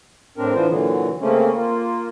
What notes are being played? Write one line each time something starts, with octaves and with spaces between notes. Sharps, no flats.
A2 C4 D4 A#4
E3 B3 D4 F4 C5
A#2 D3 E3 F#3
C#3 A3 A#3 C4 C#4
A#3 F4